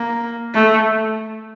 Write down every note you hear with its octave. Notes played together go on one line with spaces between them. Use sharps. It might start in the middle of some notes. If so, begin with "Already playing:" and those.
Already playing: A#3
A3